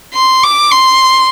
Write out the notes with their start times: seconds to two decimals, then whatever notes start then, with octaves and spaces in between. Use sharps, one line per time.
0.14 C6
0.43 D6
0.72 C6